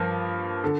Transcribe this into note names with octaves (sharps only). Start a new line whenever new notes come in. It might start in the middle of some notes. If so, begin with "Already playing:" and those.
Already playing: G2 F3 A#3
D3